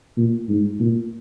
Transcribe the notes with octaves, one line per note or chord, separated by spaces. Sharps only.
A#2
G#2
A#2